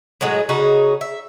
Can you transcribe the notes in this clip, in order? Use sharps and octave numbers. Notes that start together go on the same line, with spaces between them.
A2 F#3 G#3 G#4
C#3 D#4 F#4 G#4
E5